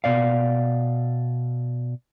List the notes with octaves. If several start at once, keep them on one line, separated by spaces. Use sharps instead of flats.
B2 D5 F5